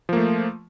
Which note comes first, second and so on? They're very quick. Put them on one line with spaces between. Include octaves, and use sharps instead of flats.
F3 A#3 A3